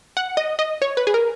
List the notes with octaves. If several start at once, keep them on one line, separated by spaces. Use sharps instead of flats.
F#5
D#5
D#5
C#5
B4
G#4
A#4